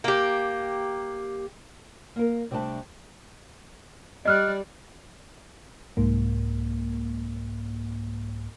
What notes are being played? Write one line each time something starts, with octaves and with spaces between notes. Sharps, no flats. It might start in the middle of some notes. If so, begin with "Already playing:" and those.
A#3 G4
A#3 A#4
C3 G3 A3 D4 A5
G3 D5 D#5 F6 F#6
C2 G#2 A#3